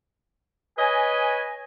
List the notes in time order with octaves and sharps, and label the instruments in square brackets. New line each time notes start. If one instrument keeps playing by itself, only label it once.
[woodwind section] B4 C#5 G#5 [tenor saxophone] D#5